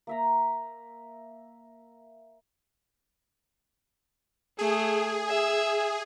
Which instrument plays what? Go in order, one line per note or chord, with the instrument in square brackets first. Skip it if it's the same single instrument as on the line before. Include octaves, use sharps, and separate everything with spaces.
[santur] A#3 E5 A#5
[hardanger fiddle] A3 [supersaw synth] G#4
[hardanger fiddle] E5